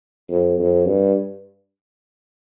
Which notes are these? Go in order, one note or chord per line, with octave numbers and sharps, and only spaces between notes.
F2
F2
G2